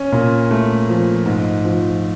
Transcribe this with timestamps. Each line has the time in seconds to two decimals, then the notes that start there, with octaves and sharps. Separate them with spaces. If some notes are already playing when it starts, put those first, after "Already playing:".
Already playing: C#4
0.12 A#2
0.51 A3
0.89 F3
1.26 G#2
1.65 F3